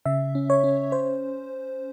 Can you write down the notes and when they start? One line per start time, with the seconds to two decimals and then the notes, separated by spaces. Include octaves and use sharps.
0.06 C#3 E5
0.35 C#4
0.50 C#5
0.64 C#4
0.92 C5